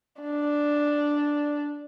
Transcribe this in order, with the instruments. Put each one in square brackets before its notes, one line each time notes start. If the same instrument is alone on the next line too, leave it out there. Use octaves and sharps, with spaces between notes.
[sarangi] D4